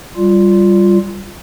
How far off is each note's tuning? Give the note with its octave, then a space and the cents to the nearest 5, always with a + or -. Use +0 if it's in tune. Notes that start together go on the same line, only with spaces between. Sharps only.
G3 +0 F4 +0